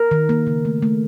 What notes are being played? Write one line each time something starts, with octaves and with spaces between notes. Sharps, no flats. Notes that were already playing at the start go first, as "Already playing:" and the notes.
Already playing: A#4
D#3
A#3
C#3
A3
A3